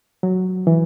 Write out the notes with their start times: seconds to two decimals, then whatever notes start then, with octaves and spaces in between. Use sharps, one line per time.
0.23 F#3
0.67 E3